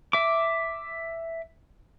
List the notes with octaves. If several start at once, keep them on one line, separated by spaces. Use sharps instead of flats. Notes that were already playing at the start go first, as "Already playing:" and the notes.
E5 D6